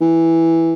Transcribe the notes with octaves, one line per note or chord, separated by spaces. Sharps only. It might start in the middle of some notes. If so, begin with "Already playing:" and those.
E3